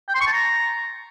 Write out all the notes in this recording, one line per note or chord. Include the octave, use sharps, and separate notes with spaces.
G5
C6
C#6
A5
A#5